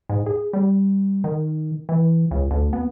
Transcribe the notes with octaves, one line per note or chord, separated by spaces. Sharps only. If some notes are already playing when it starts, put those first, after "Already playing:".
G#2
G#4
G3
D#3
E3
C#2
D2
B3